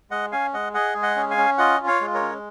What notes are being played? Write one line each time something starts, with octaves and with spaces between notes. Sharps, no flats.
G#3 D#5 F#5
C#4 F5 G#5
G#3 D#5 F#5
G#4 D#5 F#5
G#3
D#5 F#5
C#4
F5 G#5
C#4
F4 D#5 F#5
F4
C#5 F5
G#3
A#4 C#5
C#4